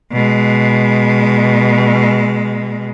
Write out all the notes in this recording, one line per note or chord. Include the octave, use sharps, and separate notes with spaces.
B2 G#3